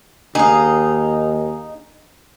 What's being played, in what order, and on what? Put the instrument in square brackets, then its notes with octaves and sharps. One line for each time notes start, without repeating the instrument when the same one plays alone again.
[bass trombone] D#2 [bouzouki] D#4 [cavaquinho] G#4 F5